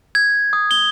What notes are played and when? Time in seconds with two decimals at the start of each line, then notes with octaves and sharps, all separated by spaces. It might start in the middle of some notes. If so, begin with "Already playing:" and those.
0.15 G#6
0.53 D#6
0.71 G7